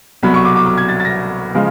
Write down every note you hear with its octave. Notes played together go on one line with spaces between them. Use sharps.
C2 B2 F#3 B5
C#6
D6
D6
D6
G#6
A6
A6
A#6
C#3 F3 G#3